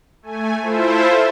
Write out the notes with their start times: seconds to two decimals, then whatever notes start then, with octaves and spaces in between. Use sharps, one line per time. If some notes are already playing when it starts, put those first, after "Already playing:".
0.22 A3 G#5
0.61 E4 F4 A4 C5 E5